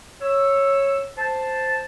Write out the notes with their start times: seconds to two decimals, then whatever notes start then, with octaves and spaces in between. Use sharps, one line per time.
0.21 C#5 E6
1.18 C5 A5